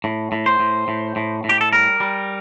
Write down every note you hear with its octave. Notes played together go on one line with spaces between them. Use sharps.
A2
A2
C5
A2
A2
A2
A2
G4
A4
G3 A#4
G3